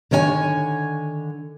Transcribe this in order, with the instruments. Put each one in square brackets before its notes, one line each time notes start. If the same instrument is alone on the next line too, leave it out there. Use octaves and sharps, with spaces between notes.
[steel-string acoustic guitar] D3 D#3 C#5 D#5 G#5